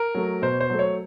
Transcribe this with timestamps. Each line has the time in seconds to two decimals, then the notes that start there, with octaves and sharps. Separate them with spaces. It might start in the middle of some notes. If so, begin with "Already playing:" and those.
Already playing: A#4
0.15 F#3 A3
0.42 B2 C5
0.60 C5
0.70 F#3 A3
0.79 C#5